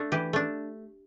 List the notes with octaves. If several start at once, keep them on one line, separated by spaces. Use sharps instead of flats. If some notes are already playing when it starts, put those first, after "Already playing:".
Already playing: A3 D4
E3 G4
A3 D4